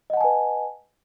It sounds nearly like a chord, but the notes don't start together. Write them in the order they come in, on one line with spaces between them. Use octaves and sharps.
D#5 F#5 A5 G#5 B4